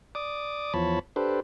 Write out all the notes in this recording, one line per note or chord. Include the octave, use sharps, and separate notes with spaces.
D5 D6 D#6
E2 F3 C#5 A5 B5
D4 G4 A4 B4 C5